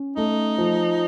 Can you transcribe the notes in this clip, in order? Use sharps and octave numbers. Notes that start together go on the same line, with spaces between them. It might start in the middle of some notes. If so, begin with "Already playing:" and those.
Already playing: C#4
A3 D#4
F3